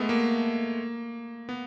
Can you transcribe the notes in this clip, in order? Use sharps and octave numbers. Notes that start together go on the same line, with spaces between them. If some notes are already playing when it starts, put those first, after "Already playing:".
Already playing: G#3 A3 B3
A#3
B3